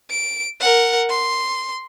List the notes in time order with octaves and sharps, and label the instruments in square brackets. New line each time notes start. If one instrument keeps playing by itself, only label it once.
[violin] D7
A#4 F#5
C6